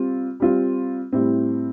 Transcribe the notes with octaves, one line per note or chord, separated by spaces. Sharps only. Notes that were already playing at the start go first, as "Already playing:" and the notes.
Already playing: G3 C4 F4
G3 C4 F4
A2 G3 C4 E4